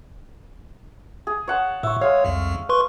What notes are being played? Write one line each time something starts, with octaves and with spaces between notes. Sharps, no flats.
G#4
C#5 F#5 A5
A2 E5 C#6
G#3 C#5 F5
C2 F2
B4 C6 C#6